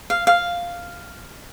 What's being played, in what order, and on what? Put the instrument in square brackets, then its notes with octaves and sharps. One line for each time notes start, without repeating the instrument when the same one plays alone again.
[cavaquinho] F5
F5